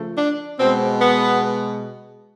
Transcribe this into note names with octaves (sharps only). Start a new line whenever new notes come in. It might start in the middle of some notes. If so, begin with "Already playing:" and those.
Already playing: C#3 F3 A3
D4
B2 G#3 C4
B3